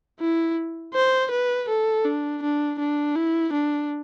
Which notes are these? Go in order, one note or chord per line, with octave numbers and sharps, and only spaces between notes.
E4
C5
B4
A4
D4
D4
D4
E4
D4